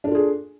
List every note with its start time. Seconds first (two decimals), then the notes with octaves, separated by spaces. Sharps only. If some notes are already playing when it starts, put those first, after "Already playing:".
0.04 D4
0.08 A4
0.11 F4
0.15 G#4